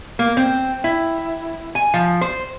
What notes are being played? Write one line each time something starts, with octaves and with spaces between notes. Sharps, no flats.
A#3
C4
E4
G#5
F3
C5